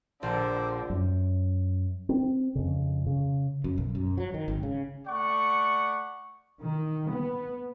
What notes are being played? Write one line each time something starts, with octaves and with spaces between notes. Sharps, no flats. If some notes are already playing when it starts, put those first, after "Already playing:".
A#1 D3 C5
F#2
C4
F2 C#3
C#3
F#2
B1
F#2
F#3
D#3
G#1
C#3
A3 D5 F#5 C#6
D#3
B3